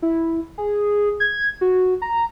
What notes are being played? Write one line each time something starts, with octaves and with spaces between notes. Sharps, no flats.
E4
G#4
G#6
F#4
A#5